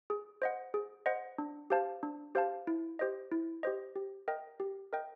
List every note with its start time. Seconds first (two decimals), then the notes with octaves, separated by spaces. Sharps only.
0.10 G#4
0.42 C5 D#5 F#5
0.74 G#4
1.06 C5 D#5 F#5
1.38 D4
1.70 G4 C5 F5 A5
2.03 D4
2.35 G4 C5 F5 A5
2.67 E4
2.99 G4 C5 D#5
3.32 E4
3.63 G4 C5 D#5
3.96 G4
4.28 A#4 D#5 G5
4.60 G4
4.93 A#4 D#5 G5